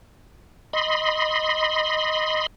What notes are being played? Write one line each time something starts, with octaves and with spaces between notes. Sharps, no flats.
D#5 B5 C6